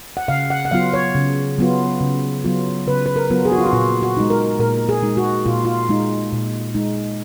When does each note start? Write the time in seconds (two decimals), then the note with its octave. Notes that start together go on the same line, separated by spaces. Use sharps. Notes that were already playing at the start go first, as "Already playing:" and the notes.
0.17 F#5
0.28 C#3 F5
0.50 F#5
0.65 F#5
0.71 F#3 B3 F4 F5
0.94 C#5
1.15 C#3
1.58 F#3 B3 F4
2.01 C#3
2.44 F#3 B3 F4
2.87 C#3 B4
3.06 B4
3.16 A#4
3.30 F#3 B3 F4
3.45 G#4
3.52 F#4
3.58 F4
3.66 F#4
3.73 A#2 F4
4.02 F#4
4.17 G#3 D#4
4.30 A#4
4.59 A#2 A#4
4.89 G#4
5.02 G#3 D#4
5.17 F#4
5.46 A#2 F4
5.65 F4
5.89 G#3 D#4
6.32 A#2
6.75 G#3 D#4